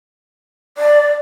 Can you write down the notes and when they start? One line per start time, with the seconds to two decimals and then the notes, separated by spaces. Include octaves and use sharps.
0.78 D5